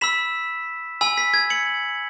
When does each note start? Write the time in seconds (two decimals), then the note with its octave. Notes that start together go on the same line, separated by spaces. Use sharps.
0.01 B5 E6 B6 E7
1.01 G#5 B5 E6
1.18 B6
1.34 G#6
1.50 C#7 F#7